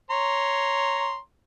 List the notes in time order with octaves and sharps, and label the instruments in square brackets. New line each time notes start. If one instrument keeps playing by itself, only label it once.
[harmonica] C#5 A#5 C6